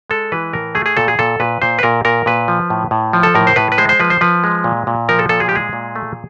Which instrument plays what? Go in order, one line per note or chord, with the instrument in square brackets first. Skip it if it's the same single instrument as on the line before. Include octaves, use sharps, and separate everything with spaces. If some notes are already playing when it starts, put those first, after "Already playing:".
[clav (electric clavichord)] G#3 A4
E3 B4
A2 A#4
A3 G#4
G#4
A#2 A4
G#4
A#2 A4
A#2 B4
A#2 C5
B4
A#2 A#4
A#2 A#4
A#2 B4
F3
A2
A2
F3
A4
A2 A#4
C5
A2 B4
B4
G#3 C5
C5
F3 B4
C5
F3 B4
G#3
A#2
A#2
F3 A#4
A4
A#2 A4
G#4
G4
G#3 G#4
A#2
A3